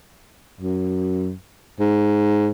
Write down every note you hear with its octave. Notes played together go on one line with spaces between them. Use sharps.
F#2
G#2